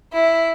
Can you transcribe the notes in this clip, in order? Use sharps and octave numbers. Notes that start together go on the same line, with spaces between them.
E4